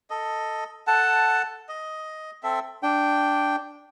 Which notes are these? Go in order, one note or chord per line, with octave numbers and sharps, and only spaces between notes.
A4 D#5
A4 F#5 A5
D#5
C4 A4 E5
D4 G5